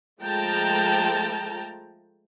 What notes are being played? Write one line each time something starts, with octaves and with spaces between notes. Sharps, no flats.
F3 G#3 A3 G5 A5 A#5